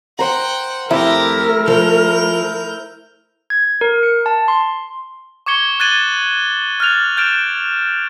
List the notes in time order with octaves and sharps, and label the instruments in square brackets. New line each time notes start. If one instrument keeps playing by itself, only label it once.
[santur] C5 A#5 [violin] F#5 G5
[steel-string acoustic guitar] F2 [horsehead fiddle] A3 A#4 [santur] E4 [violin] G4 A#5
[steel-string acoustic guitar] F3 [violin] G6 F7
[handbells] G#6
A#4
C#7
A5
C6
[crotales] C#6 D6 G#6 C#7 G7
F#6 G#6 A6 D#7 F#7 G7
F6 F#6 A6 F7
F6 G6 A6 D7 E7